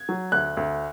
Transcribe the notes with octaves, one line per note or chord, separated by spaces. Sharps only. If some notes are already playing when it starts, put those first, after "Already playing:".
Already playing: G#6
F#3
D2 F#6
D2